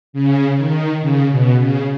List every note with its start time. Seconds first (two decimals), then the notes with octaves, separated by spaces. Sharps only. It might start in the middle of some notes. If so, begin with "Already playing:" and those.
0.13 C#3
0.57 D#3
1.01 C#3
1.30 B2
1.59 C#3